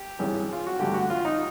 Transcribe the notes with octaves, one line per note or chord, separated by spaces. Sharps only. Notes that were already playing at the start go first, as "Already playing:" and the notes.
Already playing: G4
G#1 G2 E3 G#3 C#4
F4
F#4
A1 G2 D3 G4
F#4
F4
D#4